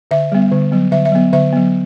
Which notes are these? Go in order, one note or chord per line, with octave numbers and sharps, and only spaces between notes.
D3 E5
G3 B3
D3
F#3 B3
D3 E5
E5
F#3 B3
D3 E5
F#3 B3